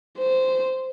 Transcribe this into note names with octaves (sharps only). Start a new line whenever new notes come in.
C5